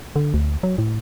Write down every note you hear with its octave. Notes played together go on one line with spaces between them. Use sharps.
D3
D2
F#3
A2